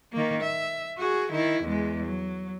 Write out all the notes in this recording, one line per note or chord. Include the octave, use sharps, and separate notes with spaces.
D#3 A#3
E5
F#4 G#4
D#3 E4
E2 G#3
F#3